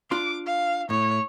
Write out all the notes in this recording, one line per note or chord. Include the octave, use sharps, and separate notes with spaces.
D4 F4 C6 D6
F5
A2 C#5